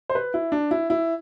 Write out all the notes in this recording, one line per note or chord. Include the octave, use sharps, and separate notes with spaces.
C5
B4
E4
D4
E4
E4